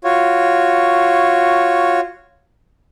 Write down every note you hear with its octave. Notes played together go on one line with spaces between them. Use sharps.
F4 F#4 C#5